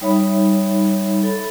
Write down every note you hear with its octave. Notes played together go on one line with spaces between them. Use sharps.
G3 D#4 C#5 E5 B5
A4 B5